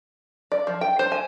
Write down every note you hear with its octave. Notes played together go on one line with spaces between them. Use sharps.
D5
F3
G5
C5
G#5